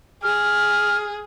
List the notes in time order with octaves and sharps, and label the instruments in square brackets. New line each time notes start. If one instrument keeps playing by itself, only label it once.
[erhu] G#4 [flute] F6